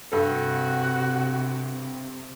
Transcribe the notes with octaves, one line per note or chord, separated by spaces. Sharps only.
G2 C3 F#4 A4